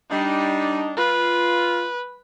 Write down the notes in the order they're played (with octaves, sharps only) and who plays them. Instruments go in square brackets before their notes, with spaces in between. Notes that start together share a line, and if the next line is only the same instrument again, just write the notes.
[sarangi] G3 [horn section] D4 D#4
[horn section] F4 [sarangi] B4